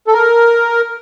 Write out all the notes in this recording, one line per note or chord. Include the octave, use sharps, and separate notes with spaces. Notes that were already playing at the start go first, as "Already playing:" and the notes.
A4
A#4